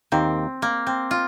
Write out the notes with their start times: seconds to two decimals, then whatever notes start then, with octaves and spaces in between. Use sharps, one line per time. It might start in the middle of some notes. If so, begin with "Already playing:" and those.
0.12 D#2 D#3 A#3 C4
0.62 A#3
0.87 C4
1.11 F4